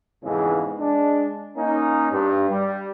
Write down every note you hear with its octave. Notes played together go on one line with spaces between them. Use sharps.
F2 G#2 C#3 E3 G#3 B3
G#3 D4
A#3 C#4 D#4
G2
G3